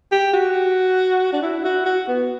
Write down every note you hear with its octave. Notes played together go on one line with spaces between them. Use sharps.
G4
F#4
D4
E4
F#4
F#4
B3